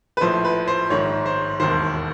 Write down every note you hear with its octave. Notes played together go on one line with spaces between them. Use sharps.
B4
A#1 A2 F3 C5
B4
C5
A#1 G#2 D#3 C#5
C5
E1 D#2 D#3 C5